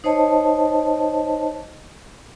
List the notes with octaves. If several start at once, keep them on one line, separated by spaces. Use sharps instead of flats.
D#4 C5 C#5 D#5 A5